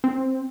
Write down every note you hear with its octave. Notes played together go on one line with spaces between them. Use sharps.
C4